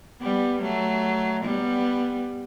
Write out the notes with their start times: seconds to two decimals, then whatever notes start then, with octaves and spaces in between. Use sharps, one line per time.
0.21 G3 B3
0.62 F#3 A3
1.44 G3 B3